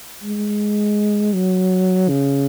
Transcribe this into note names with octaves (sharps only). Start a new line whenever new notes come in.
G#3
F#3
C#3